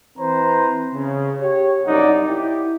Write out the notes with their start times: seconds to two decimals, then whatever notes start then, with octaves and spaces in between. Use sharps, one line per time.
0.18 E3 C4 B4 C5 A#5
0.94 C#3
1.41 G4 C#5
1.85 C2 F#2 D#4 D5 F#5
2.28 E4 G4